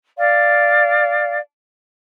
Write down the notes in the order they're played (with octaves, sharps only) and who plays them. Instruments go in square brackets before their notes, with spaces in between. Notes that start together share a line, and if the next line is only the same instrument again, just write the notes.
[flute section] D5 F5